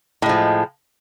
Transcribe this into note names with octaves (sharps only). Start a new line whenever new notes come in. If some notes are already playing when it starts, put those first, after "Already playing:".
A2 F3 G#3